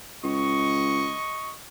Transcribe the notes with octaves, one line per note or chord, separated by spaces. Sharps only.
C#2 D#5 C#6